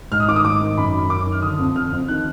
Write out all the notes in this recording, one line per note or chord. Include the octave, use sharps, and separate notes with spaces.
G#2 F6
D#6
D#3 D6
D#6
G#2 D6
D#3
F#2 B5
F#2
F#2 D6
D#3
F6
D3 D#6
F2
D3 F6
F2
D#3 F#6